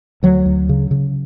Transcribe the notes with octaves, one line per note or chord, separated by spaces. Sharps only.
D2 F#3
D2
C#3
C#3